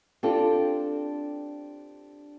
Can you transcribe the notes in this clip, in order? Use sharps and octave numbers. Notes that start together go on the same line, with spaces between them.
C4 D4 F4 G4 A4